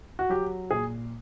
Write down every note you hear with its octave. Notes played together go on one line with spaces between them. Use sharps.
F#4
F#3 G4
A#2 G#4